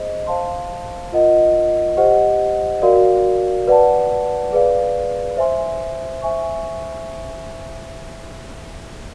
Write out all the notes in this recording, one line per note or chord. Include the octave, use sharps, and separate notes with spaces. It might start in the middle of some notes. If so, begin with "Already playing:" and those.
Already playing: G#4 C5 D#5
C5 F5 A5 C6
F4 A#4 D#5 F#5
G4 C5 D#5 F#5
F#4 A#4 D5 F5
B4 D5 F#5 A5
G#4 B4 D5 F5
C5 E5 G#5 C6
C5 E5 G#5 C#6